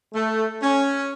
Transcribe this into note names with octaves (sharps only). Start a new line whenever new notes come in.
A3
C#4